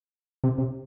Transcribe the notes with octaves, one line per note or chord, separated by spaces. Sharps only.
C3
C3